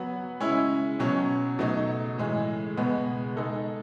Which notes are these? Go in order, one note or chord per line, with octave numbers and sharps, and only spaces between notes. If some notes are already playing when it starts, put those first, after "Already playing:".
Already playing: F#3 B3 F#4 B4
G#3 C#4 E4
B2 F#3 C#4
B2 F#3 A3 D#4
A2 E3 G#3
B2 G#3 B3
G#3 D#4 A4